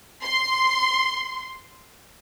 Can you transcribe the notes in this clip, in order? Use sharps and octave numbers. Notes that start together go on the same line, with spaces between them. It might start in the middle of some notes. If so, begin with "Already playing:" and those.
C6